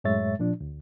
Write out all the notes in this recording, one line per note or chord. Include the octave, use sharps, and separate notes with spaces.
F#2 A2 G#3 C#5 E5 A6
A#2 F3 D4
D2